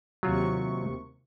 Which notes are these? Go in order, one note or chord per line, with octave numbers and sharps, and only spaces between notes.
D#2 C3 F#3 F4 C#6